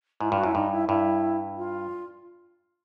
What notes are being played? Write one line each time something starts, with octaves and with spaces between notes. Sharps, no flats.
G#2 E4
F4
G2
F#4
F#2 E4
G2 D#4
E4
G2 E4
F4